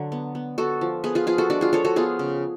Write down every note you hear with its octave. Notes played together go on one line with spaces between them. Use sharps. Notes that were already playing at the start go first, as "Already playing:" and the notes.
Already playing: D3 F#3 D4
B3
B3
B3 F#4 A4
F3
B3 G#4 B4
F4 G#4
F3 F4 G#4
F#4 A4
G#3 D4 F#4
F4 G#4
F3 A4 C#5
F#4 A4
B3 F4 G#4
C#3